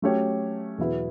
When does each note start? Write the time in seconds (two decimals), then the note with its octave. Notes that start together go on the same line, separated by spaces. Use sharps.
0.02 F#3 A3 C#4 G4 C#5
0.78 E2 B2 F#3 B3 E4